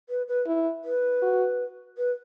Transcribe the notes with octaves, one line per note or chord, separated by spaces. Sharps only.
B4
B4
E4
B4
F#4
B4